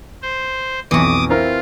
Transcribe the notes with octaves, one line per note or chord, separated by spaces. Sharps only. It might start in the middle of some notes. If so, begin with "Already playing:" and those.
C5
B1 F2 E3 F#4 D6 D#6
C4 E4 F4 A#4